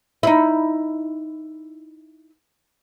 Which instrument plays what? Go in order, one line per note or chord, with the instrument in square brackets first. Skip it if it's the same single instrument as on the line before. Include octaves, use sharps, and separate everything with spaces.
[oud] D#4 E4